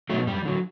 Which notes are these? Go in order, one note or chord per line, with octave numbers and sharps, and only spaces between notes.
B2 F#3 A3
F#2 G3
D3 F#3